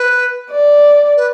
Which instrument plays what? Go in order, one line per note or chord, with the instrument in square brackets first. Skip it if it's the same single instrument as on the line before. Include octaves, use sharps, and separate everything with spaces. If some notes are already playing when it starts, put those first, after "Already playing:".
Already playing: [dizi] B4
[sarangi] D5
[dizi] B4